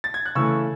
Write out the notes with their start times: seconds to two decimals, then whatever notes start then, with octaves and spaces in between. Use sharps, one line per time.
0.04 A6
0.14 G#6
0.26 F#6
0.35 C#3 E3 A3 C#6 E6